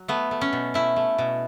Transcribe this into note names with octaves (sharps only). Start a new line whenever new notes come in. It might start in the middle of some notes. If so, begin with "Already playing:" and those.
Already playing: F#3
A3 B3
A3
C#4
B2
A3 E4
A3
B2